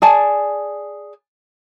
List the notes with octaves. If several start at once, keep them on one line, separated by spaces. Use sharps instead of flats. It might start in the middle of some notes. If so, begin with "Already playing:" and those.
G#4 D5 G#5 A5